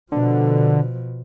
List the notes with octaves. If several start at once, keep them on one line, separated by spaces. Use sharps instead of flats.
B2 D3 F3